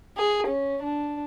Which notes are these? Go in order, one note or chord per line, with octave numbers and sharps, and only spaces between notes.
G#4
C#4
D4